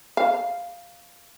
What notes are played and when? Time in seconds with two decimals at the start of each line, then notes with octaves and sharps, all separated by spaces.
0.17 F5